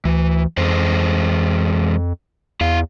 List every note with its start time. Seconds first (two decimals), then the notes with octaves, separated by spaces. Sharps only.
0.05 D2 E3
0.57 F2 E3 G#3 C5
2.61 E2 E4 F5